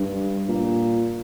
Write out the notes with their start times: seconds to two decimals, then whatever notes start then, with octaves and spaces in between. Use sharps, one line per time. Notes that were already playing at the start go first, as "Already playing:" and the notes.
Already playing: G2
0.49 A#2